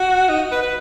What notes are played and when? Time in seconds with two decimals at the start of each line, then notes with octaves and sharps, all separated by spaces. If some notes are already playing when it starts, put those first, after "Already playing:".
Already playing: F#4
0.29 D#4
0.52 B4
0.62 B4